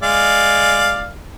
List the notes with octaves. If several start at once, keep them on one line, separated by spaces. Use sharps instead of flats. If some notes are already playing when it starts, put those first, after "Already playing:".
G#3 D5 F5